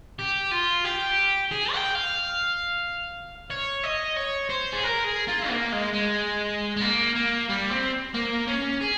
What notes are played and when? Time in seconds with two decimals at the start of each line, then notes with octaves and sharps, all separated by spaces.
0.19 G4
0.51 F4
0.84 G4
1.51 G#4
1.74 G5
1.95 F5
3.50 C#5
3.84 D#5
4.17 C#5
4.49 C5
4.73 G#4
4.84 A#4
5.05 G#4
5.28 F4
5.49 A#3
5.72 G#3
5.93 G#3
6.77 G#3
6.81 A#3
7.15 A#3
7.49 G3
7.71 C4
8.14 A#3
8.48 C#4
8.81 G#4